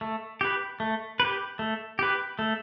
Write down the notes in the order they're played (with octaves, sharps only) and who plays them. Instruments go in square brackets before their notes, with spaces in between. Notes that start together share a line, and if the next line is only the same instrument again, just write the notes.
[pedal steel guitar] A3
G4 B4
A3
B4
G4
A3
G4 B4
A3